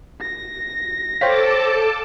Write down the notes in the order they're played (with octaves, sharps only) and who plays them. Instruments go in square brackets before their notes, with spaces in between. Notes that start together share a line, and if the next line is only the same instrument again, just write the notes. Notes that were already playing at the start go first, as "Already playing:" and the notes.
[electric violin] A#6
[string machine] A4 A5 D6 [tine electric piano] C5 C#5 B6 [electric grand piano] F5 G5